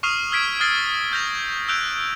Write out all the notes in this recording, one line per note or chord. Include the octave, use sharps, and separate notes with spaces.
C#6 D#6 F6 C7 D#7 F7
E6 F6 G#6 B6 D7
D#6 F6 A6 C7
F6 G6 A6 A#6 F7
E6 F#6 G6 D7 F7